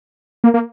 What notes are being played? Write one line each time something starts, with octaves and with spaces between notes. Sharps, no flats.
A#3
A#3